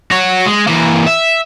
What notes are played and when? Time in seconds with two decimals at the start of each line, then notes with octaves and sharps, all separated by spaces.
0.11 F#4 C#5
0.47 G#3
0.68 E3 A#3
1.06 E5